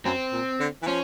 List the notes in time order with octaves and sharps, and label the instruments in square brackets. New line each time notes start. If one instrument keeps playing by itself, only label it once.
[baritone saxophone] F#2 [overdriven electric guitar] C4
[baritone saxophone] A#2
D3
E3
[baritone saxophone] F3 [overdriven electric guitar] C#4